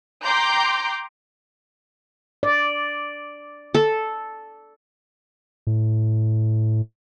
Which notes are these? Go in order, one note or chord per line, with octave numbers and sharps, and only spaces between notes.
G5 A#5 C6 D6 G6
D5
A4
A2